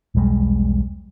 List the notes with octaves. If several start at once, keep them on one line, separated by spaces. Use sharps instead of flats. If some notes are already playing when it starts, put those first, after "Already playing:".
E1 B1 G3 G#3